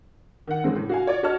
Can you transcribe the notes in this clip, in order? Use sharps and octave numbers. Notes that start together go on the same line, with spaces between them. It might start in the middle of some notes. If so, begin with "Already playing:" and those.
D#3 F#5
F#2 A2 C#3 E3 G#3 C4
A2
F#4 F5 G#5
F4 C#5 D5
F#4 C#5 D#5 A5 F6